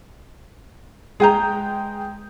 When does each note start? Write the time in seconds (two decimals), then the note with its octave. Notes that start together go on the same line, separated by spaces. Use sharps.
1.20 G#3 G#4 B4 G5 A#5 G6